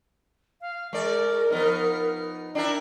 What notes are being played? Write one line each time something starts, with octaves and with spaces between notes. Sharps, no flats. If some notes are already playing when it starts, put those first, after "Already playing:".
F5
G#3 A#4 D5
F3 B3 D#4
D4 E4 A#4 G5